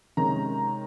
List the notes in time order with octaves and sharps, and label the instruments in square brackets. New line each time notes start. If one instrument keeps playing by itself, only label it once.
[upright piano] C3 D#3 G#3 C#4 A#5